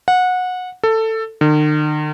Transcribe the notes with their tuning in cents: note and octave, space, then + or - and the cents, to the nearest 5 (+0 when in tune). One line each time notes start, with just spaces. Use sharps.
F#5 -20
A4 +15
D#3 -45